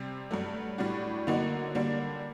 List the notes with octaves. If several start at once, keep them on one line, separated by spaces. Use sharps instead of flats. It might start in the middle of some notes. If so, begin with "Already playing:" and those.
Already playing: C3 G3 C4
G2 F#3 A3
A2 G3 D4 F#4
D3 F#3 A#3 D#4 F#4
D3 G3 A#3 D4